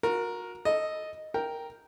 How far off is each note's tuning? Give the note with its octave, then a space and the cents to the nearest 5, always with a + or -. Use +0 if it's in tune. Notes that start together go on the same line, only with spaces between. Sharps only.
F#4 -30 A#4 +5
A4 +0 D#5 +0
A#4 +0 G5 +0